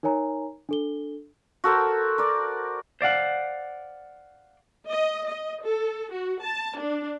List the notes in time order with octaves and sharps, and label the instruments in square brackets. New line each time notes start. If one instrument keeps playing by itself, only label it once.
[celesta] D#4 A#4 C#5 G#5 A#5
D4 A4 G7
[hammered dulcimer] F#4 A4 A#4 C5
A#4 D5
[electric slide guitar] C5 D5 F5 F#5
[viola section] D#5
D#5
A4
F#4
A5
D4